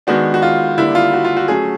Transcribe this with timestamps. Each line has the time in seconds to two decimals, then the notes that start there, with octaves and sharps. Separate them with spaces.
0.07 D#3 G#3 B3 D4 F#4
0.34 F#4
0.42 F4
0.77 D3 G3 A#3 D4 E4
0.95 F4
1.13 F#4
1.24 F4
1.37 F#4
1.48 F#3 A3 C#4 G#4